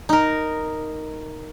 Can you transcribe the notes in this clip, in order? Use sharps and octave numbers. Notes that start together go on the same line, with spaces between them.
D#4 A#4